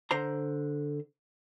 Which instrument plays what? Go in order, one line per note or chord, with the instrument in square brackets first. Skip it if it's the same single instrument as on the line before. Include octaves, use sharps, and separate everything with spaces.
[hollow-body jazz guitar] D3 C5 A#5